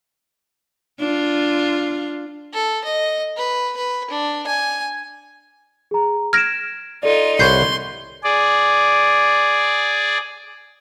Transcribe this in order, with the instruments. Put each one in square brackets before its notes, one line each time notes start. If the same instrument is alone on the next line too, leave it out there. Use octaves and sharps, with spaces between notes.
[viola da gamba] D4 F4
[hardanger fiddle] A4
D#5
B4
B4
D4
G#5
[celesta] G#4 A#5
[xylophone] F6 A#6 [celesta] G#6 D7 E7
[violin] D#4 F4 [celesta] A4 D5
[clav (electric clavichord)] C2 B4 C#5 [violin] C6 [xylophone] G6 C7
[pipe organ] G#4 D5